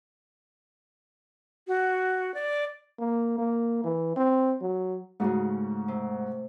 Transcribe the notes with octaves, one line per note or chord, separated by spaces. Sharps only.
F#4
D5
A#3
A#3
E3
C4
F#3
G#2 C#3 A3 F#4
C3